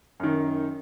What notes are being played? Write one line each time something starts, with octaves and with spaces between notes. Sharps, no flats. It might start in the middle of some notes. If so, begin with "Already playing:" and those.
F#2 D#3